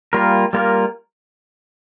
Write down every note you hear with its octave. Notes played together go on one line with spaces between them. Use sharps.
G3 A#3 F4 A#4
G3 A#3 F4 A#4